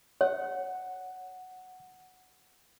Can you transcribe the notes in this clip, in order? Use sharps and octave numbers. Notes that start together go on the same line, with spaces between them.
C#5 F#5